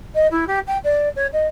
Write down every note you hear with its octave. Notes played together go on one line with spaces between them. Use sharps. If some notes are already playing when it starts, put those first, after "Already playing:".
D#5
E4
G4
G5
D5
C#5
D#5